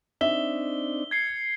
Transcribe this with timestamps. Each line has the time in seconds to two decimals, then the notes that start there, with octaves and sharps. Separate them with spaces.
0.21 C4 D4 D#4 E5 G7
1.11 G#6 C7 C#7